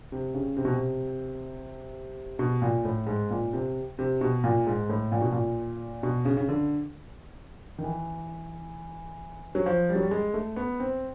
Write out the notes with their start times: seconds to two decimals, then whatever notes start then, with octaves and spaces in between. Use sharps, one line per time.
0.12 C3
0.34 C#3
0.57 C3
0.65 B2
0.72 C3
2.39 B2
2.62 A#2
2.85 A2
3.07 G#2
3.30 A#2
3.53 C3
3.99 C3
4.21 B2
4.44 A#2
4.66 G#2
4.90 A2
5.12 A#2
5.21 B2
5.32 A#2
6.03 B2
6.25 C#3
6.37 C#3
6.49 D3
7.78 D#3
7.84 E3
9.55 F#3
9.66 F3
9.89 G3
9.95 F#3
10.03 G3
10.11 G#3
10.34 A3
10.56 B3
10.80 C4